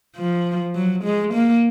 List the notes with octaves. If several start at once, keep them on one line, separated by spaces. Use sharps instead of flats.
F3
F#3
G#3
A#3